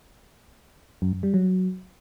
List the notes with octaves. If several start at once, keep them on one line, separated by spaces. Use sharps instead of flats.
F#2
F#2
G3
F#3